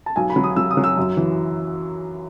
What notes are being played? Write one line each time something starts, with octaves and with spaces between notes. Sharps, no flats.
A5
B1 G#5
B5
F#3
D#6
F#3 E6
D#6
F#3
E6
F#2
E3